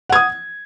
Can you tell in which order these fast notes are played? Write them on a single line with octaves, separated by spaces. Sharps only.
F#5 G#6 D#6